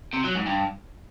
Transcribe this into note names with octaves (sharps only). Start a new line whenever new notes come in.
C3
F#3
G#2
G2